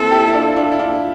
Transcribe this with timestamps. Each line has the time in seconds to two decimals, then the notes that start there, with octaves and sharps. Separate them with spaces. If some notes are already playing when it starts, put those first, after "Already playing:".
Already playing: A#3 C4 E4 A4
0.11 E4 G4
0.27 E4
0.34 D4 F4
0.56 D4 F4
0.72 E4
0.79 D4 F4